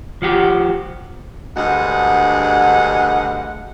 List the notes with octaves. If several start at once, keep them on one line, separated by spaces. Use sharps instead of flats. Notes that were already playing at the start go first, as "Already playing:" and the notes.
F3 F#4 G4
D2 G2 G#3 F#5